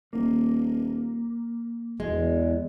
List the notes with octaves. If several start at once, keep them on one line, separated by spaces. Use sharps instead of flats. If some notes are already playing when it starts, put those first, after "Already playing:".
D#1 A#3
E1 E2 G#3